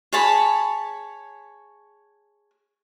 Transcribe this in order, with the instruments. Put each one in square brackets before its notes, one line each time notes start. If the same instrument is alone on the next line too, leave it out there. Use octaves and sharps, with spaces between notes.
[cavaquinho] G#4 C#5 A5 B5